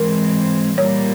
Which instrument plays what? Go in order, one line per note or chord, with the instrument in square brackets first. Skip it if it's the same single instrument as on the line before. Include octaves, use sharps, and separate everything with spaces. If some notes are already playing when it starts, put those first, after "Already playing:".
Already playing: [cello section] G#2 E3 G#3 C4 [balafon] A#4
[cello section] A#2 G3 A#3 [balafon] C#5